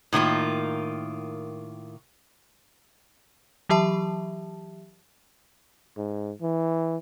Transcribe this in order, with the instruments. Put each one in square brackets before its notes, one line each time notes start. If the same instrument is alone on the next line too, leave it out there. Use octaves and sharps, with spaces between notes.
[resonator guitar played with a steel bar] A2 D#3 A#3 F4
[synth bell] E3 F#3 G4 E5 A5
[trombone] G#2
E3